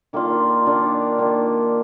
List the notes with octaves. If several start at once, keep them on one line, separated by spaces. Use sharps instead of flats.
D#3 A#3 D4 F4
D#3 A#3 D4 F4
D#3 A#3 D4 F4